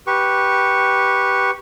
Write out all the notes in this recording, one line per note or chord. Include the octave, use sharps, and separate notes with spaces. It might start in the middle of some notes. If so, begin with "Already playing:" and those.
G4 B4 C#6